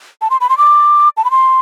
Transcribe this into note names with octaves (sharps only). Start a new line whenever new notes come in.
A5
C6
B5
C6
D6
A5
B5
C6